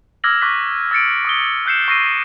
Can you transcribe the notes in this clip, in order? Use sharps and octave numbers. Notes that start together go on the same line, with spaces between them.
D6 E6 F6 G#6 A#6 F#7
C#6 D6 F#6 B6
E6 A6 C#7 D7
C#6 D#6 G7
E6 F#6 G6 C7 C#7 E7
C#6 E6 A#6 C7 D#7